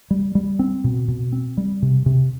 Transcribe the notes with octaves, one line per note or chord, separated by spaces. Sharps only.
G3
G3
C4
B2
B2
C4
G3
C3
C3